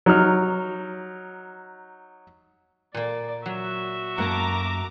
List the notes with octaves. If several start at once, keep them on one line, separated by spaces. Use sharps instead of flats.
F#3 D#4 F6
A#2 A#3 D5
F#3 F#4 E5
F#2 A#3 F#5 A5 A#5 D6